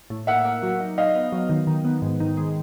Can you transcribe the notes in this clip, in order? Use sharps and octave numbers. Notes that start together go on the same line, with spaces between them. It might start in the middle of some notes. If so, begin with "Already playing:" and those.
A2
A#3 E5 F#5
A#3
F#3
D#4
D#4 D#5 F5
B3
F#3
D#3
D#3
B3
G#2
D#3
G#3